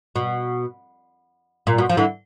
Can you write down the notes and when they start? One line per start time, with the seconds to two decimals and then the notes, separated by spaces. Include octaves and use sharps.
0.16 B2
1.67 A#2
1.78 B2
1.89 F3
1.97 D3 E3